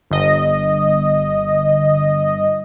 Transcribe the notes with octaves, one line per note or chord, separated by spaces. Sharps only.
G1 D#5